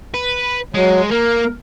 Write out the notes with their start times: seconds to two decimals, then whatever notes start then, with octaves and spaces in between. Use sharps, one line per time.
0.14 B4
0.74 F#3 G#3
1.11 A#3 A#4